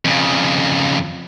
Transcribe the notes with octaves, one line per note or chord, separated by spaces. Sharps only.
F2 C#3